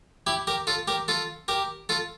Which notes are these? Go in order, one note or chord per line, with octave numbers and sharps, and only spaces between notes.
E4 G4
G4 A#4
F4 A4
G4 A#4
F4 A4
G4 A#4
F4 A4